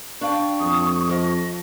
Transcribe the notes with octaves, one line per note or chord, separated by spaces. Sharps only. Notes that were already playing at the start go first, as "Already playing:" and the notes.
D4 F5 G5 C#6
F2 D#6
F3 D#5